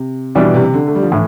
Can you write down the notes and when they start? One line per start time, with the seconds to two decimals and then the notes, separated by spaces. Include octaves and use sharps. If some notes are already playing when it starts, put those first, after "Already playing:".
Already playing: C3
0.35 B2 E3 G3 D4
0.54 C3
0.73 D3
0.87 A3
0.95 G3
1.02 F3
1.12 A2 E3